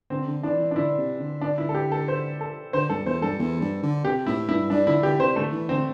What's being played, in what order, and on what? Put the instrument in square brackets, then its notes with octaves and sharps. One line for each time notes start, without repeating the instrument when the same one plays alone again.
[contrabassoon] D3 [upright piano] C4
[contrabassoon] D3
[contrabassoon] E3 [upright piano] D4
[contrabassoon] E3
[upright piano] D4
[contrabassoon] D3 [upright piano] E4
[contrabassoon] C3
D3
[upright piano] D4
E4
A4
G4
A4
C5
A4
[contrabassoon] D3 [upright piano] C5
[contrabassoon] G2 [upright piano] A4
[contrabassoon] E2 [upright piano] C5
[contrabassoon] G2 [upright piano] A4
[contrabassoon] E2
G2
D3
[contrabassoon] C3 [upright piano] G4
[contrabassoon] A2 [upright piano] E4
[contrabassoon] G2 [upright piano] E4
[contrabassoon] G2 [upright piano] D4
[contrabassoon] D3 [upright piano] E4
[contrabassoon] D3 [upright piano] G4
[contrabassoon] C3 [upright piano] C5
[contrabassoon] D3 [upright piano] A3
[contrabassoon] E3
[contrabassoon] D3 [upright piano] C4